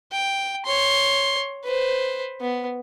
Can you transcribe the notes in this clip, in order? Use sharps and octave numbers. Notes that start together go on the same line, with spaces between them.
G5
C#5 C6
B4 C5
B3